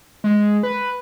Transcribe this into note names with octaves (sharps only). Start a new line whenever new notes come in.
G#3
B4